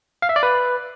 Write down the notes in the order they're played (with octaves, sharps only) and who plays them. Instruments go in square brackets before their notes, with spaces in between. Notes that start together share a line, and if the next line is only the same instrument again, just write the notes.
[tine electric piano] F5
E5
D5
B4